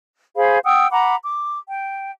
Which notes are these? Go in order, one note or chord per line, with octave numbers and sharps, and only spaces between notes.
G#4 C5 F5 B5
F#5 G5 D#6 E6
F#5 A#5 B5 D6
D6
G5